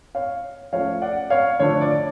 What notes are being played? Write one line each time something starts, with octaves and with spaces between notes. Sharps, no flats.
C#5 F5
F3 A3 C#4 C#5 F5
D5 F#5
C#5 F5
D3 F3 A3 D4 C#5
D5